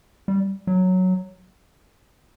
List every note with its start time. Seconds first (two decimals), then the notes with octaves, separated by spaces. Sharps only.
0.28 G3
0.67 F#3